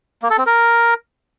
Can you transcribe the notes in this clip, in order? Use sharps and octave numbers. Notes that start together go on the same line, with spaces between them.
A#3
A4
C4
A#4